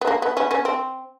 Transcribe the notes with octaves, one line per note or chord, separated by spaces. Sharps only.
B3
A#3
B3
B3 C#4
B3 C#4
C4